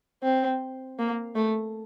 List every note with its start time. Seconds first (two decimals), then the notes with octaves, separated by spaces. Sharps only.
0.23 C4
0.99 A#3
1.36 A3